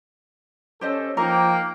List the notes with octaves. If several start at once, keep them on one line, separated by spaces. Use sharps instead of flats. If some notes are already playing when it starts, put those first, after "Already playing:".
C#4 G4 A4 C5 D#5
F3 A#3 D#4 A#4 G5